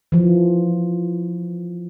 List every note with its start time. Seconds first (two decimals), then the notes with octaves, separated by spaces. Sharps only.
0.12 E3 F3